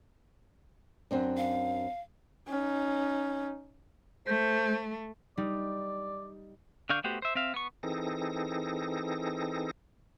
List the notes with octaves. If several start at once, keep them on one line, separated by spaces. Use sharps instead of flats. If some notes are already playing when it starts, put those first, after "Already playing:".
F#2 C4 D4
F5
C#4 D#4
A3 C5
G3 D#4 D5
D3 D4 F5 C#6 G6
A3 B3 F#4 G4 C5
C5 E5
C4 E5 F5
B3 C#6
E3 C4 D#4 G#4 A4 A#6